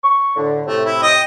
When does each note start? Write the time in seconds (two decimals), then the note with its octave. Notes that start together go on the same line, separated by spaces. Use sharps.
0.03 C#6
0.36 A2 D3
0.66 A2 C3 A3
0.85 E4
1.02 D#5 G5